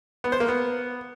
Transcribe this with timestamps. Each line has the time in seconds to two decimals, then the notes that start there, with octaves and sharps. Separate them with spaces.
0.24 B3
0.32 C5
0.40 A#3
0.48 B3